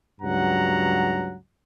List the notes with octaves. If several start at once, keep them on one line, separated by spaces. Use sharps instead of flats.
C#2 G2 F#3 F#5 A#5